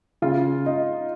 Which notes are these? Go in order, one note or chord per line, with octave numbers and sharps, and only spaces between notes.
C#3 F4
D#4 F4